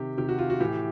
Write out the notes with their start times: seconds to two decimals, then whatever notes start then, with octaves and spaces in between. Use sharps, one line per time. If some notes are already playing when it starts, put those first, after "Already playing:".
Already playing: C3 D#3 G4
0.17 C3 D#3 G4
0.29 F#4
0.38 F4
0.50 F#4
0.60 A2 E3 G4